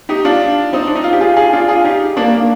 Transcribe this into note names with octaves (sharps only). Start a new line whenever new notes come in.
D#4 G4
D4 F4
C4 D#4
D4
D#4
F4
G4
F4 G#4
F4 G#4
D4 F4
F4 G#4
D#4 G4
A#3 D4
A#3